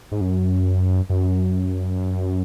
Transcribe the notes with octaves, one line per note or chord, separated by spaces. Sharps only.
G#2
F#2
F#2